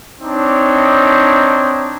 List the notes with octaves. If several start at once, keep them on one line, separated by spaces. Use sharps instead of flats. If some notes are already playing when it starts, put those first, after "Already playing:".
C4 D4 D#4 C#5